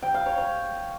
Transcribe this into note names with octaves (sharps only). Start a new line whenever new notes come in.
G5
F5
C#5
C#5